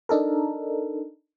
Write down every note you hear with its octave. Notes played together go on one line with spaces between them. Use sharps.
D4 D#4 A4 A#4